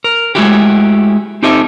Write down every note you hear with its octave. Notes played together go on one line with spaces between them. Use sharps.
A#4
G#3 A3 E4 F#4 G4
C4 D#4 G4 A4 D#5 E5